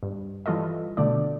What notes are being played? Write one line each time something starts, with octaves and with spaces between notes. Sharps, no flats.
G2
E3 G3 F4 A4 D#5
B2 D3 A3 D5